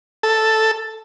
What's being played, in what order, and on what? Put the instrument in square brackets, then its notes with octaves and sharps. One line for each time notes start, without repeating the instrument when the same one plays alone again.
[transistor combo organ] A4